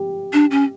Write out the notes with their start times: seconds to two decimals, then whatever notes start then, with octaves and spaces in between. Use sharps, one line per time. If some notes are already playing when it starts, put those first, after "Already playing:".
Already playing: G4
0.33 D4
0.51 C#4